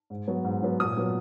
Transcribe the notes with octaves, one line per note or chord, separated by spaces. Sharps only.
G#2
F#3 B3
G#2
F#3 B3
A#2 D#6
F#3 B3